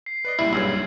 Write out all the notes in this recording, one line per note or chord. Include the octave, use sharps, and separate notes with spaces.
C7
B4 D5 D#5
C#2 A#2 G3 E4 F#7
B1 G2 C#3 E6 G#6